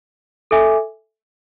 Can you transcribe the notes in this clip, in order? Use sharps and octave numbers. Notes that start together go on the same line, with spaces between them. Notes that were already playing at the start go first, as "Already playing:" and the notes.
A4 E5 G#5 D6